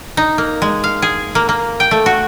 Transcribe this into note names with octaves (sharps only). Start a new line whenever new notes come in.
D#4
A#3
G#3
F5
G#4
A#3
A#3
G5
A3
F#4